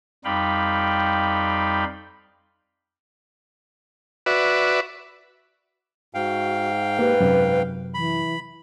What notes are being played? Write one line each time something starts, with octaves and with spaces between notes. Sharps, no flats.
F2 G3 D#4 F5 G5 B5
F#4 B4 D5 E5
G#2 F#4 F5 G5
A#3 G4 B4
F#2 C3 F#3
E3 B5